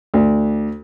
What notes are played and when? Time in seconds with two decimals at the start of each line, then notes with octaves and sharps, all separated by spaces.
0.14 D2